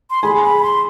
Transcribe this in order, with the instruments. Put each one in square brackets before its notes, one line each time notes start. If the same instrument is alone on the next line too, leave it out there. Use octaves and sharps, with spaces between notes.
[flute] C6
[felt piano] G#4 G#5 [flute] B5
[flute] B5
C6